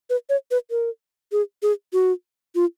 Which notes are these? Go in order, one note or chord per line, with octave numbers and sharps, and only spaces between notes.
B4
C#5
B4
A#4
G#4
G#4
F#4
F4